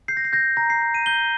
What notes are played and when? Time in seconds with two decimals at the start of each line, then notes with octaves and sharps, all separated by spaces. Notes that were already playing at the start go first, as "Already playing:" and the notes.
0.08 G6 C7
0.17 A#6
0.25 C7
0.33 G6 A#6
0.57 A#5 A#6
0.70 C7
0.82 G6
0.94 D#7
1.06 G6 G7